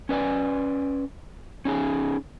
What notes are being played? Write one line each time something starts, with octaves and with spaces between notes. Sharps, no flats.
C#4 B4 D5 G#5
C#4 D#4 G#4 G#5